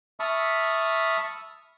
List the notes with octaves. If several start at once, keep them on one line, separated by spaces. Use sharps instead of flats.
E5 A5 B5 C#6 D#6 F6